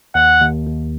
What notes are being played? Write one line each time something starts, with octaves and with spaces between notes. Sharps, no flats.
D#2 F#5
D#2
D#2